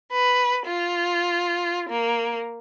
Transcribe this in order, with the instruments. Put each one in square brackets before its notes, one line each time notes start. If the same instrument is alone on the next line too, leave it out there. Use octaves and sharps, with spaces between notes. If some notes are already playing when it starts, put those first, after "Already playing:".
[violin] B4
F4
A#3